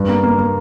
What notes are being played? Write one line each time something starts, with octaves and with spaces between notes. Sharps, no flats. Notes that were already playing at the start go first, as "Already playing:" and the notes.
Already playing: G2
A#3
A#3
A#3